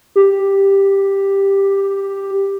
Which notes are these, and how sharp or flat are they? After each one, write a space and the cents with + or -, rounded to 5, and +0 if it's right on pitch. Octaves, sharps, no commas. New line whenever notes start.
G4 +5